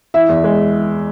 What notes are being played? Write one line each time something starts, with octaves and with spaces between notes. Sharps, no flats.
E3 E5
E2
G#3